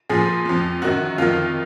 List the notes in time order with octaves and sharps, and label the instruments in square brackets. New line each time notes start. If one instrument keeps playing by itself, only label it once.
[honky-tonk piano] A#2 F3 G#4
F2 F3
F#2 D#3 F#4
F2 D#3 F4